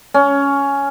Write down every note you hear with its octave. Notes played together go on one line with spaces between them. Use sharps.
C#4